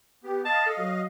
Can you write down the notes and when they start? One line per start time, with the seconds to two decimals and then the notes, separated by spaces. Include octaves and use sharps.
0.24 B3 G4
0.45 D#5 F5 A5
0.66 A4
0.78 F#3